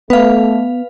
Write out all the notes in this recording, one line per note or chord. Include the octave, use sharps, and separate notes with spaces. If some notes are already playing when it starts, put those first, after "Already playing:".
A3 B3 B4 F5